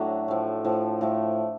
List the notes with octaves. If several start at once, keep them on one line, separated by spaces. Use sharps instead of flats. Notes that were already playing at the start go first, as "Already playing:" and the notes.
Already playing: A2 F#3 A3 D4
A2 F3 A3
A2 F3 A3
A2 F3 A3